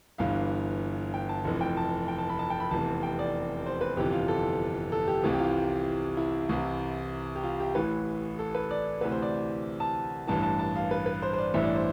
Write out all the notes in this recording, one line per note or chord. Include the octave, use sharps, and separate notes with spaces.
G1 G2 E3 F5
G5
A5
F1 F2 E3
G5
A5
G5
A5
B5
A5
G5
B5
F1 E2 C3 E3 A5
G5
D5
C5
B4
G1 F2 C3 E3 G4
F4
A4
A4
G4
C2 C3 E3
G4
F4
E4
C2 C3 E3
G4
F4
G4
A1 A2 E3 B4
A4
B4
D5
D2 C3 E3 B4
C5
D5
A5
A1 G2 E3 A5
A5
A5
F5
B4
B4
C5
C5
D5
A1 G2 E3 E5
D5
C5